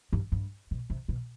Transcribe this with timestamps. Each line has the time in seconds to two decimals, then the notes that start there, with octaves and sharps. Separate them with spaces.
0.13 G2
0.32 G2
0.71 B2
0.90 C3
1.09 B2